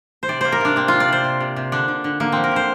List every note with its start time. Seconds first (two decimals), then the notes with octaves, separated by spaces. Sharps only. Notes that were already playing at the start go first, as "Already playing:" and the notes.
0.23 C5
0.28 C3 D5
0.41 A#3 C5
0.52 A#4
0.61 C3 D4
0.76 A#3 C4
0.88 C3 F4
1.00 D5
1.08 C3 C5
1.24 C3
1.40 C3
1.56 C3
1.72 D3 D4
1.88 D3
2.04 D3
2.20 D3 A#3
2.32 F3 C4
2.44 A#4
2.52 D3 C5